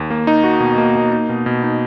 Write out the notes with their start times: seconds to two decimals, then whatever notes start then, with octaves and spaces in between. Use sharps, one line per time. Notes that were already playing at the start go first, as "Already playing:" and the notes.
Already playing: D#2
0.10 A#3
0.27 D#4
0.44 F#4
0.60 B2
0.78 A#3
0.96 A#3
1.13 D#4
1.29 B2
1.46 B2
1.63 D#4